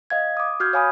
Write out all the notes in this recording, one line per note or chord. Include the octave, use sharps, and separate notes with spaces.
D#5 F5 G#6
D6 D#6
F#4 F6 G6 G#6
C#5 F5 G#5 B5 D#6